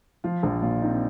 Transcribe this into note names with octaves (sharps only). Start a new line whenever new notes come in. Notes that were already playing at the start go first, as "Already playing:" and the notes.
F3 F4
A#1
A#2 F4
C4 D#4